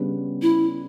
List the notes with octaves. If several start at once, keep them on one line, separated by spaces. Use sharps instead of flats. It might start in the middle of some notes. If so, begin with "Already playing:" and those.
Already playing: C#3 G3 B3 D4
E4